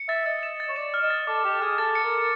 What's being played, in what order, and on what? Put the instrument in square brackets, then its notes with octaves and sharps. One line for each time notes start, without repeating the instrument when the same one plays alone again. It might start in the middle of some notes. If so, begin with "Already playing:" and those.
Already playing: [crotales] C#7
[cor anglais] E5 [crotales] A6
[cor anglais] D#5 [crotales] A6
[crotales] E7
A6
[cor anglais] C#5
[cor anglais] D5 [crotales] E7
[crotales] F6
[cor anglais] D#5
[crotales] A6
[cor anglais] A4 [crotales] D6
[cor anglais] G4 [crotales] D6
[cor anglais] G#4 [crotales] F6
[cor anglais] A4 [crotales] A6
[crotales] C#7
[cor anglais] A#4
[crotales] C#7